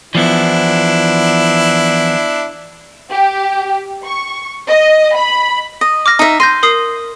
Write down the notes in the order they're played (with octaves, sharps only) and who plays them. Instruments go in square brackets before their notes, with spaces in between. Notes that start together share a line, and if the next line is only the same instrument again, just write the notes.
[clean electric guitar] E3 F3 B3 [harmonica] D4 E4
[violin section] G4
C#6
D#5
B5
[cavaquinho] D#5
[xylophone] D6 F6 A#6
[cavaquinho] D#4 E5
[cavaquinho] C6 [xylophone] G6 A#6 D#7
[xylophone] A#4 D#6 C7